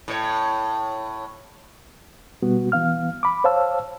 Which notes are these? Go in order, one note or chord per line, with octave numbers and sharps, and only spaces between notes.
A2 C#5
B2 G3 B3 F#4
E3 B3 F5 F6
B5 D6
C5 C#5 F5 A5 E6